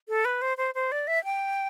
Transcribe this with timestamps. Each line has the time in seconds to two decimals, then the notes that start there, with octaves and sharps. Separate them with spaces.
0.08 A4
0.25 B4
0.42 C5
0.57 C5
0.75 C5
0.92 D5
1.07 E5
1.24 G5